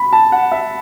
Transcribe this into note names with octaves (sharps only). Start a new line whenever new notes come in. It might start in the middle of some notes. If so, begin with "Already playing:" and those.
Already playing: B5
A5
F#5
E5